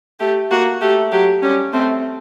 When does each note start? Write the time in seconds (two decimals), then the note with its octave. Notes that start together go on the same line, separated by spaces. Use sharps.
0.20 A3 G4
0.51 A#3 F#4
0.81 A3 G4
1.12 F#3 G4
1.42 G3 C#4
1.73 A3 C4